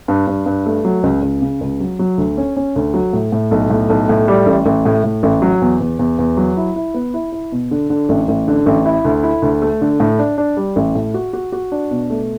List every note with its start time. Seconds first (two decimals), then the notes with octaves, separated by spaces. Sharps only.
0.08 G2
0.27 G2
0.46 G2
0.66 A3
0.85 F#3
1.03 C#2
1.22 C#2
1.42 C#3
1.61 C#2
1.80 F#3
1.99 F#3
2.18 D2
2.37 C#4
2.57 C#4
2.76 D2
2.94 F#3
3.13 A2
3.32 A2
3.51 B1
3.70 A2
3.90 B1
4.09 A2
4.28 G3
4.46 A1
4.66 A1
4.85 A2
5.04 A2
5.23 A1
5.42 F#3
5.62 E2
5.80 E2
5.99 E2
6.19 E2
6.37 F#3
6.57 E4
6.76 E4
6.94 B3
7.14 E4
7.32 E4
7.52 B2
7.71 D3
7.90 D3
8.09 A1
8.28 A1
8.48 D3
8.66 A1
8.85 E4
9.05 D2
9.23 E4
9.42 D2
9.62 A3
9.81 D3
10.00 A2
10.19 D4
10.38 D4
10.57 G3
10.76 A1
10.95 A2
11.14 F#4
11.33 F#4
11.52 F#4
11.72 D4
11.91 B2
12.10 A3